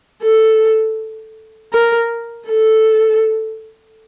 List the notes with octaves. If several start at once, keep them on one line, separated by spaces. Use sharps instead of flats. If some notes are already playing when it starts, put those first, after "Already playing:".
A4
A#4
A4